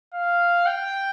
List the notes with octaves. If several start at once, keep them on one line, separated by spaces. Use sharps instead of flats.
F5
G5